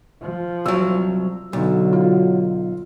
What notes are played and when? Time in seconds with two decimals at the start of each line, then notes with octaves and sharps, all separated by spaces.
0.21 F3
0.66 C2 F#3 E6
1.53 B1 D3 F#3
1.93 F4